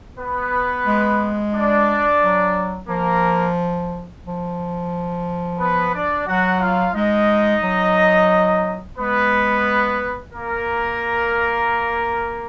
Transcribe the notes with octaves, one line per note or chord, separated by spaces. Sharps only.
B3 B4
G#3
D4 D5
F#3
F3 A#3 A#4
F3
B3 B4
D4 D5
F#3 F#4 F#5
F4 F5
G#3 D#4 D#5
F#3
G#3 B3 B4
A#3 A#4